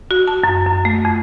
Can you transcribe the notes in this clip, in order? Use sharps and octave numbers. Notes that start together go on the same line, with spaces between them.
F#4
A5
F#2
F#2
A3
F2